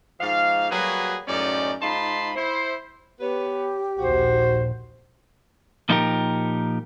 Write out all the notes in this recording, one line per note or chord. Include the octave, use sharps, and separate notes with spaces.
G#2 D#3 F3 F5
F#3 G3 A#3 F#4 G#4 B4
F#2 A2 G#3 C#4 D#4 D5
G#2 D#4 F4 A5 B5 C6
E4 C5
B3 G4 B4 C#5
A#1 D#2 F#4 C5
A#2 F3 D#4 E4 G4 A#4